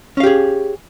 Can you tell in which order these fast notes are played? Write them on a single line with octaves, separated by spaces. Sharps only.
C#4 F5 G4 G#4